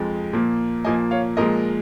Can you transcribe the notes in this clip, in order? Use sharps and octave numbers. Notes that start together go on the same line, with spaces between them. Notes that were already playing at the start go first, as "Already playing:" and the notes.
Already playing: F2 F3 G#3
A#2 F3 A#3
A#2 F3 A#3 D#5 G#5
C#5 F5
A#2 F3 G#3 A#4 D#5